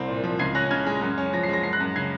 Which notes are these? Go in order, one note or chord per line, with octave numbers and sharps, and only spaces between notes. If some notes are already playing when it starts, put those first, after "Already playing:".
Already playing: C2 C4
A#2
F3
C#2 G#6 C7
C#4 F#6 A#6
C#3 F6 G#6
G#3
F#2
C#4
F3 A#6
C7
G#3 A#6
F#2 C7
F#6 A#6
F#2
C#3 G#6 C7